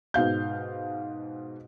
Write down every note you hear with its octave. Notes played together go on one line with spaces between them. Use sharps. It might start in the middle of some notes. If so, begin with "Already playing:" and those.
G#2 B2 F5 G6